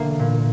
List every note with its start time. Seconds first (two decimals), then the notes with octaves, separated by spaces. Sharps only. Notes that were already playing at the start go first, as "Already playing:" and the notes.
Already playing: E1 D3 A#3
0.19 A#2